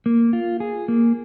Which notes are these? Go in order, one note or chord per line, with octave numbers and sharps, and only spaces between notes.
A#3
F4
G#4
A#3